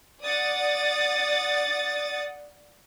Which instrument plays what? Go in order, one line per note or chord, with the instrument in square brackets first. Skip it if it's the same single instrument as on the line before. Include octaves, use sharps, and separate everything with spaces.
[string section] D5 F#5 D#6 A6